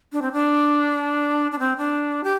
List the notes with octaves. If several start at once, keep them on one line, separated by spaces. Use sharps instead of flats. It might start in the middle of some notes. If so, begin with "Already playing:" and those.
D4
C4
D4
D4
C4
D4
G4